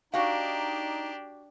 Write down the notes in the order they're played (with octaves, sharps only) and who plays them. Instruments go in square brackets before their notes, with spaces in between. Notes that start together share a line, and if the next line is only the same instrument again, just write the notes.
[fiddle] D4 G4 [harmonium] D#4 [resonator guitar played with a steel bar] F#4 F5